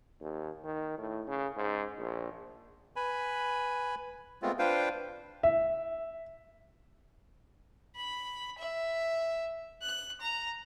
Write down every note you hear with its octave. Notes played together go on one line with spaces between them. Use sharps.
D#2
D#3
A2
C#3
G#2
A#1
B4 G#5 B5
G#3 A3 B3 C4 F4
D4 F4 B4 C5 F5 G5
E5
B5
E5
F#6
A#5